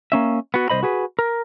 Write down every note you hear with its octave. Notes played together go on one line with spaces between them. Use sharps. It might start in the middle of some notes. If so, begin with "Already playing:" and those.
A#3 C#4 E5
B3 F#4
C2 C5 D#5 B5
F#4 G#4 B4
A#4